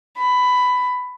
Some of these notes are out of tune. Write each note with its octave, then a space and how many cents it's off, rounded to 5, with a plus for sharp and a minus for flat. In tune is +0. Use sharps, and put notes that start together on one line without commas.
B5 +15